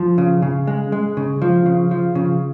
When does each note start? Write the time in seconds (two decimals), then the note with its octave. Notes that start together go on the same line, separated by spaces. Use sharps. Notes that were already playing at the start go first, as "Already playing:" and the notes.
Already playing: F3
0.18 C#3
0.42 C#3
0.67 G#3
0.92 G#3
1.17 C#3
1.42 F3
1.66 C#3
1.91 F3
2.15 C#3